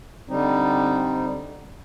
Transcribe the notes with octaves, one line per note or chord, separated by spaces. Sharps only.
D3 G3 C4 D#4